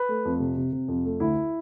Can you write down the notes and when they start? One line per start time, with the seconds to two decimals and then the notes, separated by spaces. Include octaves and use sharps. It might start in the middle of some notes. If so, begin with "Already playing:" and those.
Already playing: B4
0.09 A3
0.25 F2
0.40 C3
0.57 C3
0.72 C3
0.88 F2
1.05 A3
1.20 D2 E4